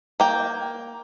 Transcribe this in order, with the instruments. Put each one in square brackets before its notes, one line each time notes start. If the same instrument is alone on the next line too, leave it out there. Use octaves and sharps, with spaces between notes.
[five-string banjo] A#3 G5